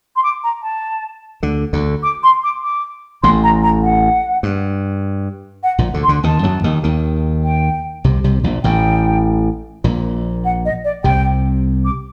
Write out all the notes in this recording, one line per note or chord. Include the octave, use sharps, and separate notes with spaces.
C6
D6
A#5
A5
D2 D3
D2 D3
D6
C6
D6
D6
A1 A2 C6
A#5
A#5
F#5
G2
F#5
A#1 A#2
D2 D3
C6
D2 D3
D#2 D#3 A5
F#2 F#3
D#2 D#3
D#2 D#3
G5
C2 C3
C2 C3
A#1 A#2
A1 A2 G5
A#1 A#2
F#5
D#5
D5
C2 C3 G5
D6